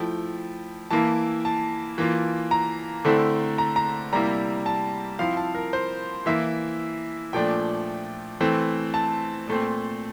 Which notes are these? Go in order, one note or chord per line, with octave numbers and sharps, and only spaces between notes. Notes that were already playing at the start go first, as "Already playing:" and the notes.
Already playing: F3 A3 E4 G5
E3 A#3 E4 A5
A5
E3 A#3 F4
A#5
D3 A3 C4 E4
A#5
A#5
C3 G3 A#3 E4 A#5
A5
F3 C4 E4 F5
A5
A#4
C5
E3 A#3 E4 E5
A#2 F3 A3 D4 G5
E3 A3 C4
A5
A#2 A3 C4